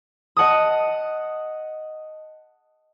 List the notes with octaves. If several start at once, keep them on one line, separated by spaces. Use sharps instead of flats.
D#5 F#5 A5 D#6